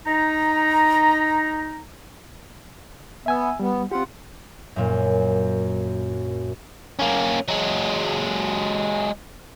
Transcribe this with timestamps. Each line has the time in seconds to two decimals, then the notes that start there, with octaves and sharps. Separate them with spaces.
0.06 D#4 A#5
3.26 B3 E5 G#5 E6
3.60 G3 B3
3.91 C4 F4 G4 F#5
4.76 F#2 A#2
6.99 A#3 C#4
7.48 F#3 G#3